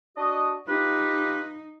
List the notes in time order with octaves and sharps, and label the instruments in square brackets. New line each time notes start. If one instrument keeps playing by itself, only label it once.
[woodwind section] D4 F#4 D#5
[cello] D#4 [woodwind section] F4 G4 B4